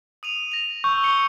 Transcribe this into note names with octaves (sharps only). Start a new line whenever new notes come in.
D#6 D#7 F7
A#6 F7
C#6 E6 G6
C#7 G7